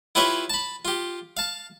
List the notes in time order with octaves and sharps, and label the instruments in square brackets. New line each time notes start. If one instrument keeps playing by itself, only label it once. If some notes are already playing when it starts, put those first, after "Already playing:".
[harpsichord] E4 F4 G4 B4 C#5 E5
A5 B5
F4 G4
F5 A5